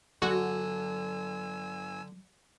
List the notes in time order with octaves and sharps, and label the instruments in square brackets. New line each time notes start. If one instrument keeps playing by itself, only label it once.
[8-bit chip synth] G1 G#5 E6 [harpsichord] D3 [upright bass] F#3 [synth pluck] F#4